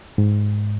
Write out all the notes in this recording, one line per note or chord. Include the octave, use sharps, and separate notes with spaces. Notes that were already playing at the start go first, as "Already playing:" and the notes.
G#2